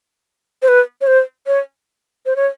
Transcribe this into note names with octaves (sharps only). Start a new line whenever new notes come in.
C5
B4
C#5
C5
C#5
C5
C#5